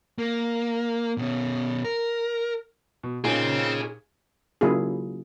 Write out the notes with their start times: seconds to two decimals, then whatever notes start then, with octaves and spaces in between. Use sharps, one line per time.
0.18 A#3
1.18 B2 C#4
1.84 A#4
3.03 B2
3.24 A#2 C4 D#4 G#4 C#5 G#5
4.61 C#3 F#3 A#3 E4 F4 G#4